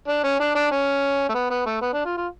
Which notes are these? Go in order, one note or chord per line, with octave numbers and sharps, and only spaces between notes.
D4
C#4
D4
D4
C#4
A3
B3
B3
A3
B3
D4
F4
F4